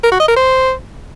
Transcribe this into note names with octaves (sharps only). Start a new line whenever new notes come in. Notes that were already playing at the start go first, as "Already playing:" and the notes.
A#4
F#4
D#5
A#4
C5